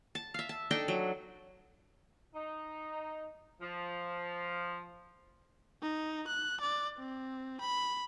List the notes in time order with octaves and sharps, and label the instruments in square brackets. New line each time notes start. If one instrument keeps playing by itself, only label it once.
[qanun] A5
E5 F5
A5
D4 D#4 A4 G5
F#3
[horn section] D#4
F3
[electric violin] D#4
F#6
D5
C4
B5